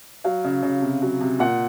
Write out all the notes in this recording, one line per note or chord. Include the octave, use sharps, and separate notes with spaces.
F#3 F5
C#3
C#3
C3
F#3
C3
A#2 F#5